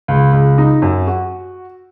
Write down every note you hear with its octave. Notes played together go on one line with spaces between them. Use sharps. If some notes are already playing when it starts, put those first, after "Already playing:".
C#2
C#2
D#4
F#2
F#4